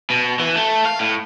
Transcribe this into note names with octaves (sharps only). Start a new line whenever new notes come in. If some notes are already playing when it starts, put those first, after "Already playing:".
B2
E3
A3
F5
A2